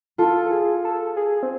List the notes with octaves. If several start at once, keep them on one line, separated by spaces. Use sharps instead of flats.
F4 A4
A4
G#4
A4
G#4
C4